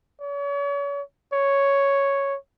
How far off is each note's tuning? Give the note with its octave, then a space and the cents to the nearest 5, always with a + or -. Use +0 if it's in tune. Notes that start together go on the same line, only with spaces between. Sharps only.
C#5 +40
C#5 +0